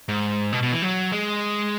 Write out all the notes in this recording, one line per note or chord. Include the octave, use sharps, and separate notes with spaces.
G#2
B2
B2
E3
F#3
G#3